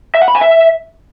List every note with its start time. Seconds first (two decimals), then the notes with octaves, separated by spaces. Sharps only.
0.15 E5
0.21 F#5
0.28 B5
0.35 G#5
0.41 E5